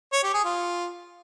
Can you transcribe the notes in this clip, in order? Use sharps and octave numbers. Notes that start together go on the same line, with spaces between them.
C#5
G4
G#4
F4